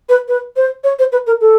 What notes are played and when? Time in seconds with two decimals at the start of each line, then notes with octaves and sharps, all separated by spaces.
0.09 B4
0.28 B4
0.56 C5
0.84 C#5
0.99 C5
1.12 B4
1.26 A#4
1.41 A4